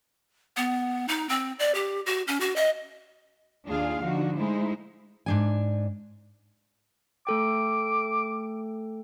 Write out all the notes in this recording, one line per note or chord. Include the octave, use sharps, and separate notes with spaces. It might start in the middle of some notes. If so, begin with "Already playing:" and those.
B3
D#4
C4
D5
G4
F#4
C#4
F#4
D#5
D#2 D4 F4 G#4 F5
D3 F3 D#4 F#4
G#3 A3 D#4 E4 C5
G#2 D4 G#5
A3 A4 G5 D6